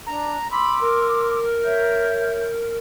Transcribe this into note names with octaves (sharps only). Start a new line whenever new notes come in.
D4 A#5
B5 C6 D6 E6
A#4
C#5 E5 G6